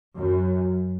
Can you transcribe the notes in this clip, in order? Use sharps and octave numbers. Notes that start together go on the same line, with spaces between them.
F#2